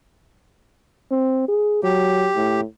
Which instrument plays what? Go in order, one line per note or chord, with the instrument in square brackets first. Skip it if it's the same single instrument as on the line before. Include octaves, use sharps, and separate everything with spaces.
[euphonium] C4
G#4
[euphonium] F#3 [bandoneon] G4
[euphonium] A2